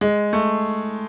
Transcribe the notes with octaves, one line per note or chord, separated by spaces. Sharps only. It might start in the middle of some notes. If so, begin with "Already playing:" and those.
G#3
A3